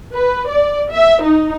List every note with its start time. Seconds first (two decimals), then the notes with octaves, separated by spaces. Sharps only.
0.16 B4
0.50 D5
0.92 E5
1.25 D#4